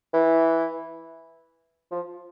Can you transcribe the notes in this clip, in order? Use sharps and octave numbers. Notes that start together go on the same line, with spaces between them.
E3
F3